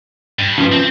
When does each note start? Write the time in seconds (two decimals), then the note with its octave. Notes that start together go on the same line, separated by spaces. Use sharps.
0.39 G2
0.58 C#3 F3 B4
0.72 C4